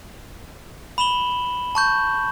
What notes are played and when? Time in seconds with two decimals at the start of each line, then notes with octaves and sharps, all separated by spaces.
0.98 B5 E7 F#7 G7
1.75 A5 C#6 G6